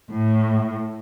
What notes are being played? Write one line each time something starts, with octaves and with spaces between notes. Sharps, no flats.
A2